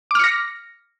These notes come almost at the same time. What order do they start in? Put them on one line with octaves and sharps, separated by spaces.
D6 F6 C#7 A#6